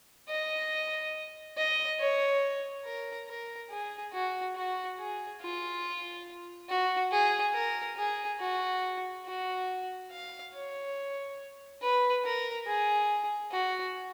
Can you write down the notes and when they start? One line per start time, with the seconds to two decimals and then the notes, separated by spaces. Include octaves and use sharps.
0.29 D#5
1.58 D#5
2.00 C#5
2.85 A#4
3.28 A#4
3.71 G#4
4.13 F#4
4.55 F#4
4.99 G#4
5.42 F4
6.69 F#4
7.11 G#4
7.54 A#4
7.97 G#4
8.40 F#4
9.25 F#4
10.11 F5
10.54 C#5
11.82 B4
12.25 A#4
12.66 G#4
13.52 F#4